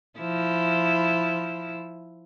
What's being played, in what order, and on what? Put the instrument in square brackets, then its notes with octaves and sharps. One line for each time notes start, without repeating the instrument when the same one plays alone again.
[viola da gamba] F3 E4